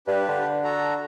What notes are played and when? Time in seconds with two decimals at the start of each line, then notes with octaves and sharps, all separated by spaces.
0.07 G2 D4 G4 B4
0.29 D3
0.64 F#4 A4 A#5